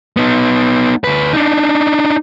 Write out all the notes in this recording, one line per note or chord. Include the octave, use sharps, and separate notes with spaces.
B3 D#4
D2 B4
D4 D#4